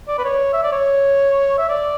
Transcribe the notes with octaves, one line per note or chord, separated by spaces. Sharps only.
D5
B4
C#5
E5
D5
C#5
E5
D5